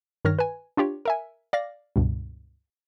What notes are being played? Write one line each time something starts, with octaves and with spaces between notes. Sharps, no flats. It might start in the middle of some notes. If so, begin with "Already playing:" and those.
G2 D#3 C#5 F6 A#6
B4 G#5
D4 F4 G4 C#5
A#4 E5 G#5
D5 F5 A#6
C#2 G2 B2